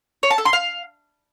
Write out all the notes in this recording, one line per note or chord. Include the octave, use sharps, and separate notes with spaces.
C#5
A5
A4
C6
F5